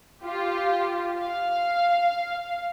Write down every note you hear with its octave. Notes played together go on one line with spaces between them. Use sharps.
F4 G4
F5